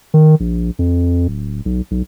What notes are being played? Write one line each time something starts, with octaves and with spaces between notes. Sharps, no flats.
D#3
A#1
F2
D1
B1
B1